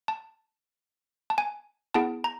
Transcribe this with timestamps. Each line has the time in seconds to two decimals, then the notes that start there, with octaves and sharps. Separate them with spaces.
0.08 A5
1.30 A5
1.38 G#5
1.94 B3 E4 G#4 A5
2.24 A#5